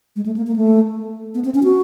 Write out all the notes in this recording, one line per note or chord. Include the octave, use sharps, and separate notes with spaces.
G#3
A3
A#3
A#3
A3
B3
C4
C#4
F#4